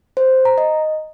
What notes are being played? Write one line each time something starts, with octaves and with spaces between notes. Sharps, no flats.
C5
A#5
D#5